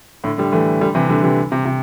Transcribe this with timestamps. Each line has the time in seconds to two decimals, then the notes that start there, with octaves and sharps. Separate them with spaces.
0.24 A2 D3
0.38 D3 G3
0.52 E3 A3
0.81 D3 G3
0.95 C3 E3
1.09 D3 G3
1.24 C3 E3
1.52 C3
1.65 C3